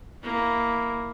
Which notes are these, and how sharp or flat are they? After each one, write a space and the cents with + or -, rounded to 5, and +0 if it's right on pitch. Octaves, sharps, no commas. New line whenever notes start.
A#3 +0 E4 +0